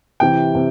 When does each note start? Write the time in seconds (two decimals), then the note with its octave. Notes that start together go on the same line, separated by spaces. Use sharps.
0.20 C3 E3 G5
0.55 C3